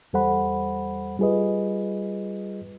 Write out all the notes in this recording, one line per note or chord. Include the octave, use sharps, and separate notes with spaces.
E2 G3 A4 C5 F#5 B5
G3 F4 G#4 B4 D#5